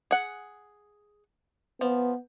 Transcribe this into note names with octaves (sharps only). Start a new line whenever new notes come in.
G#4 F#5
F3 B3